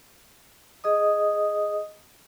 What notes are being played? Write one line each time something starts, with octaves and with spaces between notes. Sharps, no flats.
G#4 D#5 D#6